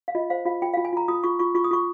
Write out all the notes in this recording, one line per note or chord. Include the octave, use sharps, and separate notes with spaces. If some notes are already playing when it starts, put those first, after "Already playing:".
F5
F4 D#5
C5 F5
F4 F5
F4 G5
F5
F4
G#5
F4 A#5
F4 D#6
F4 C#6
F4 C#6
F4 C#6
D#6
F4 C#6